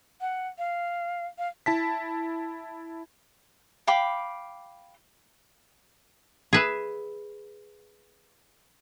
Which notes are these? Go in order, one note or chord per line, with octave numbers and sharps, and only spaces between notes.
F#5
F5
F5
E4 A5 B6
F5 G5 B5 D6
G#4 B4 E5